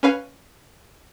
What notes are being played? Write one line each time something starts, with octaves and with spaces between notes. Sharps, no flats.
C#4 B4 F5 G#5